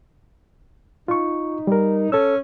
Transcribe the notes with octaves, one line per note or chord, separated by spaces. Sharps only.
D#4 F4 C#6
G3 A#4
C#4 A4 E6